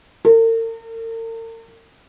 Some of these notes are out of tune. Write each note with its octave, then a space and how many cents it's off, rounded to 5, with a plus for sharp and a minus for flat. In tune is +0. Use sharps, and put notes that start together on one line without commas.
A#4 -45